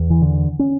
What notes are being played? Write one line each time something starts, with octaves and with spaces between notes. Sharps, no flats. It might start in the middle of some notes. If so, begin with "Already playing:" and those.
Already playing: E2
E3
D3
C#4